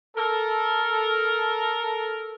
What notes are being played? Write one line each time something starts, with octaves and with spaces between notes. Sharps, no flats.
A4 A#4